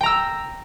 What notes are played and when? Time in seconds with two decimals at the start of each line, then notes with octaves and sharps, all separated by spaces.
0.01 G5
0.03 A#5
0.06 E6